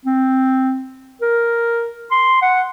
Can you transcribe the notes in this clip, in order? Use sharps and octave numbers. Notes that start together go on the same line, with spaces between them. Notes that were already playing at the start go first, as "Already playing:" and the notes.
C4
A#4
C6
F#5